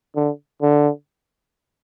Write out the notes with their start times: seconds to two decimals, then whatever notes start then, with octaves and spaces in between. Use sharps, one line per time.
0.16 D3
0.62 D3